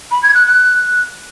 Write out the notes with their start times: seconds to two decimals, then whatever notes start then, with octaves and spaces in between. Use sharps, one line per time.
0.11 B5
0.23 G#6
0.34 F#6
0.46 F#6